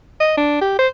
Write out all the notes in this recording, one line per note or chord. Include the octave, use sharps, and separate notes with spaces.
D#5
D4
G4
C5